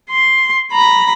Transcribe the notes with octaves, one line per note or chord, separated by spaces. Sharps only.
C6
A#5 B5